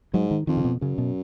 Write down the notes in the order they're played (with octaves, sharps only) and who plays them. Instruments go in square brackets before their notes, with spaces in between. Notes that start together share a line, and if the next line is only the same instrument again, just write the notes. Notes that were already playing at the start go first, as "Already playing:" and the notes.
[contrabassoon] G#2 [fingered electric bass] F#3
[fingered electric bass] D#3
[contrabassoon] F2 [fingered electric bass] D#3
[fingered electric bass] C#3
B2
[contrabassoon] F#2 [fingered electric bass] C#3
[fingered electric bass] B2